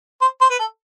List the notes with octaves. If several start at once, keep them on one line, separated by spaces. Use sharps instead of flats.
C5
C5
B4
A4